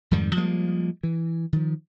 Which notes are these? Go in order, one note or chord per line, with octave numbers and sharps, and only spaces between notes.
F2 G#2 D#3 G3
F3 G3 G#3 A#3
E3
D#3 F3